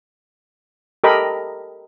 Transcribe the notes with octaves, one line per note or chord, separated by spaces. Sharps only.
G4 A4 A#4 D#5 B5